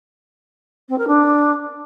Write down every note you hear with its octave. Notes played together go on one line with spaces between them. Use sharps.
C4
A#4
D4